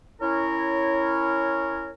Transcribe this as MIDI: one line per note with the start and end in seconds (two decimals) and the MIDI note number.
0.21 1.90 61
0.21 1.90 64
0.21 1.90 70
0.21 1.90 73